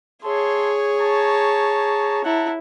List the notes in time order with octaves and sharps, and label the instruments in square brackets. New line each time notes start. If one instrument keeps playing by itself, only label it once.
[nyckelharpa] G#4 C#5 [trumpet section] E5 A5 C6
[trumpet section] A5 A#5 C#6
[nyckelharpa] E4 [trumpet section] F#5 A5 A#5